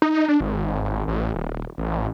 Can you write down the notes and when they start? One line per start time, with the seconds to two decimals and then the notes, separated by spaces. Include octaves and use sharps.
0.02 D#4
0.28 D4
0.41 G#1
1.08 A1
1.35 D#1
1.78 A1